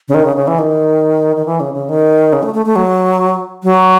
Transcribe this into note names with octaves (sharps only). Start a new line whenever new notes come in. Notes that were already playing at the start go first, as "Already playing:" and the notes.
C#3
D#3
C#3
C#3
E3
D#3
D#3
E3
C#3
C#3
D#3
C#3
A3
A3
A3
F#3
F#3